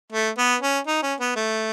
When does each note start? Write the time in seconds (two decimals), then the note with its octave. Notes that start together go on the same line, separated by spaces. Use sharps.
0.13 A3
0.38 B3
0.62 C#4
0.87 D#4
1.03 C#4
1.20 B3
1.36 A3